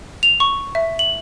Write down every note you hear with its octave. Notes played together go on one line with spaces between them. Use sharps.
F7
C#6
E5
F#7